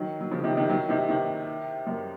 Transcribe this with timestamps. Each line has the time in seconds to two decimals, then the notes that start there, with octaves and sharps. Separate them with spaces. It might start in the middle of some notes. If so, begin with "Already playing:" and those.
Already playing: D#3 F#3
0.21 F#3
0.31 C#3 F3
0.44 C3 D#3
0.57 C3 D#3
0.69 D#3 F#3
0.89 C3 D#3
1.08 C3 D#3
1.87 F#2